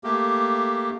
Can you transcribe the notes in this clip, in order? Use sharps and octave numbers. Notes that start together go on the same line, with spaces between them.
A3 A#3 G4